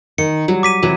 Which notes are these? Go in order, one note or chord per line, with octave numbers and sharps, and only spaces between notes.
D#3 C#7
F#3 G3
D6 B6 D#7
C3 E3 F#3